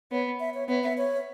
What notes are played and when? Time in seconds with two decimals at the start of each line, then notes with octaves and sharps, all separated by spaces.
0.11 B3 C#5
0.40 E5
0.54 C#5
0.68 B3 C#5
0.83 E5
0.97 C#5